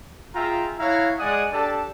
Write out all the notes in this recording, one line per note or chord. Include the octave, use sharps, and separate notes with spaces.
F4 G#4 E5 G5 A#5
E4 C#5 F5 F#5 A#5
G#3 D5 F#5 G#5 D#6
D4 G4 A4 D5 A5